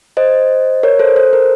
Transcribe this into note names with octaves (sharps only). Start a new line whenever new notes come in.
C5 D#5
A#4 C#5
A4 C5
A4 C5
A#4